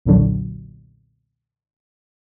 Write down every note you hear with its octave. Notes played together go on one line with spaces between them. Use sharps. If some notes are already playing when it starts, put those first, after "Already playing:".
B1 E2 A#2 D3 F#3